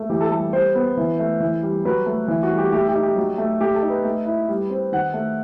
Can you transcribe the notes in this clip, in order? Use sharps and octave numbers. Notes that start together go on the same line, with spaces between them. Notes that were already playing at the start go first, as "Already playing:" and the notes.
Already playing: A3
E3 G4
A4
G3 A4
G3 C5
B3
E3
A3
E3
G3
F#3 B4
A3
E3
F#4
G3
G4
A3 G4
G4
D#4
G4
F#3
A3
A3 G4
A4
D#4
B4
A3
E4
G3
C4
D#3 F#5
A3